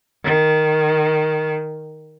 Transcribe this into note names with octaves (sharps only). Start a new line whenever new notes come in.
D#3